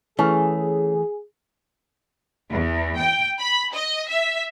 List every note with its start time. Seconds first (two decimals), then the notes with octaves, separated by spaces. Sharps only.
0.19 E3 A3 C#4 G#4
2.51 E2
2.98 G5
3.40 B5
3.74 D#5
4.08 E5